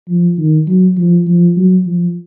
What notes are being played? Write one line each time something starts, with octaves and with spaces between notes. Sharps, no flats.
F3
D#3
F#3
F3
F3
F#3
F3